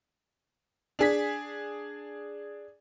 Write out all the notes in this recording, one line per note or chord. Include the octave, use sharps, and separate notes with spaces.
D4 G#4 B6